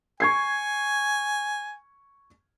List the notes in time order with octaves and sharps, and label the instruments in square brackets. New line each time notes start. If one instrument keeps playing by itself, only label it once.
[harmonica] G#5 [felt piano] C#6 G#6 C7